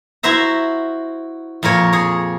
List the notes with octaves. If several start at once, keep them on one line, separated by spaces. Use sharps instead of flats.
E4 F#4 C5 E5 A#5
F2 A#2 A#4 C#5
G#4 C#5